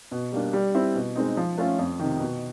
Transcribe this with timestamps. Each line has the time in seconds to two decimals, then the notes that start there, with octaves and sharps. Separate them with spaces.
0.11 B2
0.32 G3 A#3 D4
0.53 G3
0.75 C4 E4
0.95 B2
1.15 G#3 C4 D#4
1.37 F3
1.58 A3 C#4 F4 A4
1.79 F2
1.99 C3 D#3
2.20 B2